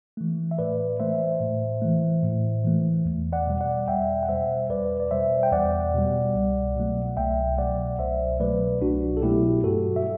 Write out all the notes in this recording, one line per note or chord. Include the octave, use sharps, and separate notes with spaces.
E3 A3
E5
A2 B4 D5
E3 A3 C5 E5
A2
E3 A3
A2
E3 A3
E2
D5 F#5
B2 G3
D5 F#5
E2 E5 G5
F#5
B2 G3 C5 E5
E2 B4 D5
D5
B2 G3 C5 E5
G5
E2 D5 F#5
B2 G3
C2
B2 F#3 A3
C2 E5 G5
B2 F#3 A3 D5 F#5
C2 C5 E5
B2 F#3 A3 B4 D5
C2 D4 F#4
A4
B2 F#3 A3 E4 G4
G2 F#4 A4
E5